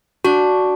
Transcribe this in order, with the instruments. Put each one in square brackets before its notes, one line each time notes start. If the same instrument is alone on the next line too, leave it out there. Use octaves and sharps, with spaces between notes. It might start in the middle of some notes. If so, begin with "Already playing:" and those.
[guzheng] D4 [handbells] F#4